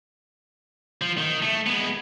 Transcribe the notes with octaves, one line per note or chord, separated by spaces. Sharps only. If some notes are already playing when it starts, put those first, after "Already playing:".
F3
D#3
A3
G#3 B3